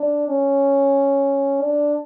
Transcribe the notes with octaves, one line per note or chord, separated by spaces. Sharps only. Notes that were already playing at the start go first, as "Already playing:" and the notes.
Already playing: D4
C#4
D4